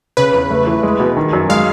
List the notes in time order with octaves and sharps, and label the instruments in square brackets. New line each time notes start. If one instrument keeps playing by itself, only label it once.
[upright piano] C#3 [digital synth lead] B4
[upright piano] E2
A3
E3
G#3
B2
D#3
F#2
[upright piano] G#3 [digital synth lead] F5